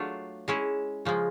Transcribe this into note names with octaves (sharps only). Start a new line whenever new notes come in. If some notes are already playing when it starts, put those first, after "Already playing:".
Already playing: F#3 A3 D4 F4
G#3 C#4 E4
C#3 F3 G#3